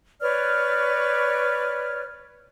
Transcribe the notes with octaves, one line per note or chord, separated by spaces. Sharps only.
B4 C#5 D5 F6